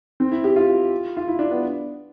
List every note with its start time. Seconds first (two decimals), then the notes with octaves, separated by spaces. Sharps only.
0.20 C4
0.31 E4
0.44 G4
0.56 F4
1.17 F4
1.28 E4
1.39 D4
1.51 B3